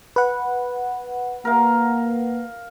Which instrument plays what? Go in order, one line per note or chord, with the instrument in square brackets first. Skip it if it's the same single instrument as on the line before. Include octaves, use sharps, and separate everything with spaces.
[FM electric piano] B4 F#5
[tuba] A#3 [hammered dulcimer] A#4 F5